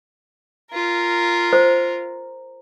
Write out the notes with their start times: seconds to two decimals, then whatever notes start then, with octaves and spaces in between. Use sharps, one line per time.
0.71 F4 A#4
1.53 C5